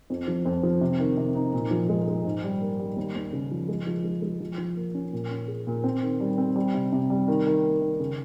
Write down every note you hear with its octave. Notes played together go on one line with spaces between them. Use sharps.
F2
F3
F2
F3
C3
D#3
C3
D#4
A#2
F3
G#3
G#3
G#2
G3
A#3
G3
D#2
D#2
C#3
F3
G#3
F3
G#3
G#3
F3
F3
A#3
C#4
A#2
C#4
G#4
A#2
C4
D#3
G3
C4
G3
C3
C3
G3
D#3
D#3
A#3
D#3
C#3